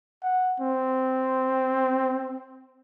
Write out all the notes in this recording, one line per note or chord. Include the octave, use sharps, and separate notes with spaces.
F#5
C4